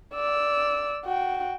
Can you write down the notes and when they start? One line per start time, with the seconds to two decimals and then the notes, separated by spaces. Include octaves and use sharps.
0.15 D5 E6
1.05 F#4 G5